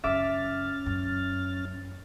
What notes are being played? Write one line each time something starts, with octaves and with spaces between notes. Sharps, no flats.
F#2 C#3 C#4 E5 D6 F6 A6
F#2